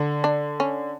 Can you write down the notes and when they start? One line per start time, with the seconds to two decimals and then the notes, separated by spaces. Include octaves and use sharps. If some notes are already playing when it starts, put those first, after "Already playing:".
Already playing: D3
0.24 D4
0.60 C#4